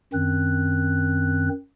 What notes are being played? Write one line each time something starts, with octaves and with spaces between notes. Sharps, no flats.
F#2 D#3 C4 F#6